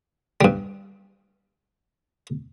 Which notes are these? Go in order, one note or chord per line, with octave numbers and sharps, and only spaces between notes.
G2 G3